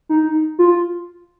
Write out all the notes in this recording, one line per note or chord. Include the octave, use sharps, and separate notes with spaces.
D#4
F4